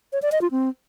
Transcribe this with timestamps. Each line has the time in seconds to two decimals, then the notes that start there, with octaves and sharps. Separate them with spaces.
0.13 C#5
0.22 D5
0.32 D#5
0.42 F4
0.51 C4